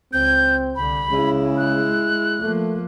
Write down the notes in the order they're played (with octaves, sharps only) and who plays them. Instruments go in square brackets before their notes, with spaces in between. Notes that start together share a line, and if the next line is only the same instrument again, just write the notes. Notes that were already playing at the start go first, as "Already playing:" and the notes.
[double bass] C#2 [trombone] C4 [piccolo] G6
[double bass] C2 D3 [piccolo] B5
[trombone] C#3 [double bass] G#3 E4
[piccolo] F#6
[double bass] F3 A#3 [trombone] A3